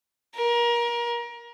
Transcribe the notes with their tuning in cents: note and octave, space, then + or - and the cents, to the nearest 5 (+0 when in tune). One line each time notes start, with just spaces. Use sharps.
A#4 +30